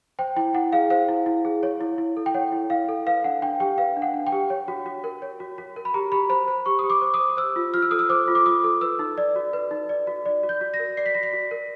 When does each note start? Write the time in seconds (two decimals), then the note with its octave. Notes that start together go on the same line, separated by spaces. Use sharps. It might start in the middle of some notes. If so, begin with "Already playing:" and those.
0.19 C5 G5
0.37 E4 G5
0.54 E4 F#5
0.72 G#4 F5
0.90 C5 F5
1.09 E4
1.26 E4
1.45 G#4
1.63 C#5
1.81 E4
1.98 E4
2.17 A4
2.26 G5
2.34 C#5 F#5
2.52 E4
2.70 E4 F5
2.89 A4
3.06 B4 F5
3.24 D4 F#5
3.42 D4 G5
3.60 G4 G5
3.78 B4 F5
3.97 D4
4.02 F#5
4.14 D4
4.27 G5
4.32 G4
4.50 C#5
4.68 F#4
4.86 F#4
5.04 A#4
5.22 C#5
5.40 F#4
5.58 F#4
5.76 A#4
5.85 B5
5.94 G4 A#5
6.12 G4 B5
6.29 C5 B5
6.48 C5 B5
6.66 G4 C#6
6.79 G4 D#6
6.90 D6
7.02 C5
7.14 D#6
7.20 C5
7.37 C5 E6
7.56 F4
7.74 F4 F6
7.82 E6
7.91 A4 D#6
7.99 E6
8.09 C5 D6
8.28 F4
8.35 D6
8.46 F4 D#6
8.64 A4
8.81 B4 E6
8.99 D#4
9.18 D5
9.36 F#4
9.53 B4
9.71 D#4
9.89 D5
10.07 F#4
10.26 D5
10.43 F#4
10.49 G6
10.61 F#4
10.74 A#6
10.79 A#4
10.97 D5 C7
11.06 B6
11.14 F#4 A#6
11.23 B6
11.33 F#4
11.51 A#4